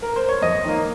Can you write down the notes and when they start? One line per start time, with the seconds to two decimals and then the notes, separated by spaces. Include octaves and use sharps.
0.02 A#4
0.16 C5
0.29 C#5
0.41 F2 D#5
0.65 D#3 A#3